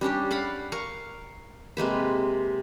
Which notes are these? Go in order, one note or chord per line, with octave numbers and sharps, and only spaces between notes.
G3 C#4 D4 G4
D5 F5 F#5 B5
A#4 F5 C#6
C3 G#3 A#3 B4